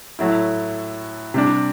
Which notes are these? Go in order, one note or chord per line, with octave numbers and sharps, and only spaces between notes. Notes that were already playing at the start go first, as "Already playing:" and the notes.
A2 F#3 A3 E4
C3 G3 D4